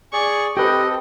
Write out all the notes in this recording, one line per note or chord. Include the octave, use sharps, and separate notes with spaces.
G#4 D5 G#5 C#6
C4 G4 A4 B4 D#5 G5